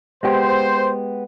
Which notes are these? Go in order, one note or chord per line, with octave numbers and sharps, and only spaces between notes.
G#3 B3 G4 C5